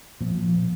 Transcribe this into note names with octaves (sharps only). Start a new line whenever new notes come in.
A#2 F3
F3
A#2